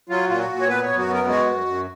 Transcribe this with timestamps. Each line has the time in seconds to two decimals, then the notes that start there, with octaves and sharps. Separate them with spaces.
0.09 F#3 F4
0.29 A#2 F4
0.39 F#4
0.49 A#2
0.61 C#5
0.68 B3 B4
0.82 C#5
0.88 F#2
0.98 F#4
1.07 B3
1.13 A#4
1.28 G#3 F#4
1.47 F#2
1.66 F#2